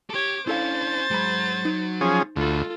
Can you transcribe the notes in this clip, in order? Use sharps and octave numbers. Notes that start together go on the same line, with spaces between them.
G4 A4 C#5 D6
C#4 D4 E4 A4 C5 F5 A6
G#2 F#3 B5
D#4
F3 C#4 G#4
D2 G#3 F4 A4 B5